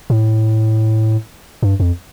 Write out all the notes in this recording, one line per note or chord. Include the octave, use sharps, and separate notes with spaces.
A2
G2
F2